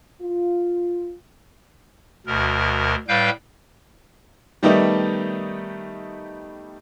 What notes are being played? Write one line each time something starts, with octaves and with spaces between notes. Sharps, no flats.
F4
D2 B2 A#4
A2 G3 B4 F5 G5 G6
D#3 G3 A3 B3 D#4 G4